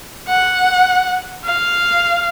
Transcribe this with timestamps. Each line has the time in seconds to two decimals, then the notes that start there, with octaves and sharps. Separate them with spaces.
0.28 F#5
1.44 F5